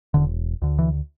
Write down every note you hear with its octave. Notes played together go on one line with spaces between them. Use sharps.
E1 D3
D2 D3
E3